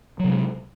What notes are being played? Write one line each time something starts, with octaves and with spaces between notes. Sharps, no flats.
C3 F#3 G#3